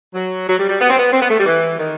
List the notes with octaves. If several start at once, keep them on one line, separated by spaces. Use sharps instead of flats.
F#3
F#3
G3
G3
B3
C4
B3
C4
B3
A3
G3
E3
D#3